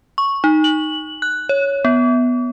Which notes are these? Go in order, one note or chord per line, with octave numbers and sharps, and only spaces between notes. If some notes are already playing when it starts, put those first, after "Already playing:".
C#6
D#4
F#7
F#6
C#5
B3